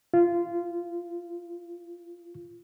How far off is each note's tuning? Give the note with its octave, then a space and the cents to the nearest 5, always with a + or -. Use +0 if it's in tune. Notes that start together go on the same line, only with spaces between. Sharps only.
F4 -15